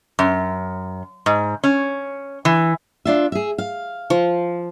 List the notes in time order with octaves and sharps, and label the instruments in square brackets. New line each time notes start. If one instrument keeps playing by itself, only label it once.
[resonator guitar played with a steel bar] F#2
G#2
C#4
E3
[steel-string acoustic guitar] D4 F4 E5
G#4 E5
F5
[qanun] F3